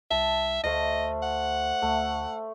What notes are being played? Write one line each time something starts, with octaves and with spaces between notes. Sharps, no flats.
C2 E5 A5
D2 A3 C5 D#5 F5
F#5
D2 A3